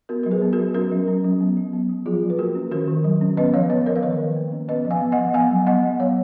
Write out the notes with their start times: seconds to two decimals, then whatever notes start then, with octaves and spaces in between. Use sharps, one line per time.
0.09 B3 F#4 A#4
0.23 F#3 A#4
0.31 G#4 B4
0.42 B3
0.53 F#4 A#4
0.59 F#3
0.74 C#4 F#4 A#4
0.91 F#3
1.08 C#4
1.24 F#3
1.41 B3
1.57 F#3
1.73 B3
1.90 F#3
2.06 F3 F4 G#4
2.23 F3
2.30 B4
2.39 A#3 F#4 A#4
2.55 C#4
2.71 D#3 F#4 A#4
2.88 D#3
3.04 F#3
3.21 C#4
3.37 B3 B4 D#5
3.54 F3 C#5 F5
3.70 B3 B4 D#5
3.86 F3 A#4 C#5
3.96 F5
4.03 D#3 B4 D#5
4.20 D#3
4.36 A#3
4.52 C#4
4.68 B3 B4 D#5
4.85 F3
4.91 F5 G#5
5.01 B3
5.12 D#5 F#5
5.18 F3
5.34 B3 F5 G#5
5.51 F#3
5.67 B3 D#5 F#5
5.83 F#3
6.00 B3 C#5 F5